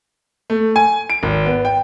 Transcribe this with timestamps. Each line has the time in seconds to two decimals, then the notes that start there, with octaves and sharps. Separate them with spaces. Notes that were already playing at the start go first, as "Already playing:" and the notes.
0.50 A3
0.76 G#5
1.10 D7
1.23 G#1
1.46 B3
1.65 G5